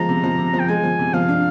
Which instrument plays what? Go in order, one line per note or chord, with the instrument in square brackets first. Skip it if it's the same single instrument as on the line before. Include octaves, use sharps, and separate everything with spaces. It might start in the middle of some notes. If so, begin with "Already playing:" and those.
Already playing: [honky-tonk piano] F3 G#3 [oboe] A#5
[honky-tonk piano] C3
F3
C3
F3
[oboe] G5
[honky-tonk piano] G#3 [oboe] G#5
[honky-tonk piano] F3
C3
[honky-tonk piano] F3 [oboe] F5
[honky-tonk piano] D4